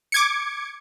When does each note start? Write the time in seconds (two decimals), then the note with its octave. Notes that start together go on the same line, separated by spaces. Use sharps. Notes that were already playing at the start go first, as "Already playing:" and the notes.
0.12 D6 G#6 C#7